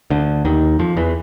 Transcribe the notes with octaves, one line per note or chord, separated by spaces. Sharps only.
D2 D3
D#2 D#3
F2 F3
E2 E3